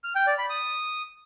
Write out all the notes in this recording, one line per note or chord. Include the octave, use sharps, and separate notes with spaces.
F6
G5
D5
B5
D#6